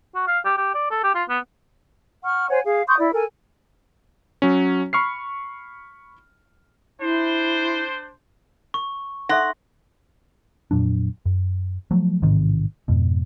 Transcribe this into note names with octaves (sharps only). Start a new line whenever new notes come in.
F#4
F5
G4
G4
D5
A4
G4
F4
B3
F#5 C#6 F6
C5 C#5 F#5 G#5
G#4 F5
C6 C#6 D#6 G6
E4 D5
A4 A#4 G#5
F#3 C#4
B5 C#6 F6 C7
D4 E4 C5
C#6
D#4 A4 E5 F#5 C6 A#6
F2 A#2 F#3 D4
F#2
F3 F#3 A3
A1 G#2 C3 D#3
F2 G#2 B2